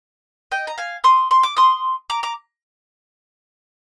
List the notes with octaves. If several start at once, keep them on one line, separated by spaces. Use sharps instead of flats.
D#5 G5
A#5
F5 G#5
C6 D#6
C6
D6
C6 D#6
A#5 D6
A#5 D6